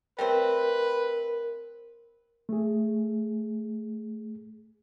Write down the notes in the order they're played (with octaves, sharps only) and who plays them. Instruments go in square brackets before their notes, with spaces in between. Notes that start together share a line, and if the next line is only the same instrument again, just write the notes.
[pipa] G3 A3 C4 [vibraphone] A#4 [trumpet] B4
[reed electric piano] A3 G#4